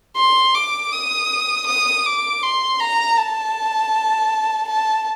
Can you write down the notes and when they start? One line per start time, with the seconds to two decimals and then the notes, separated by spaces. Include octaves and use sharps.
0.17 C6
0.55 D6
0.92 D#6
1.67 D#6
2.06 D6
2.43 C6
2.80 A#5
3.17 A5
4.68 A5